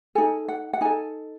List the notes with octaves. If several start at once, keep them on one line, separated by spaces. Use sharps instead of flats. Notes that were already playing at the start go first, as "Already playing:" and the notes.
D#4 A4 G#5
F#5
F#5
D#4 A4 G#5